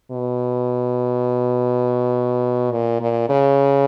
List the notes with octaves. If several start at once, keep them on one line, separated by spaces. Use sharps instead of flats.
B2
A#2
A#2
C#3